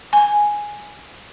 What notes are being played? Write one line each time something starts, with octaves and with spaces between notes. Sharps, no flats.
G#5